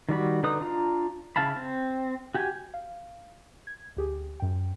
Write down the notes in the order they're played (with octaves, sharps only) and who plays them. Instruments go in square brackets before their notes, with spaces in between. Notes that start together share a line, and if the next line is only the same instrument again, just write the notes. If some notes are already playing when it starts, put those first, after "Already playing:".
[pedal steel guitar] D#3 G3 F#4 B5
D3 D#4 B4 D#6
D4 F4 A#5
C#3 E4 F5 A5 B5
C4
F#4 G4 G5 G#5
[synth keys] F5
G#6
D2 G4 G#4
F#2 G5